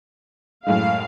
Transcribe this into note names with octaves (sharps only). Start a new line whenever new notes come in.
F#2 A2 G#3 F5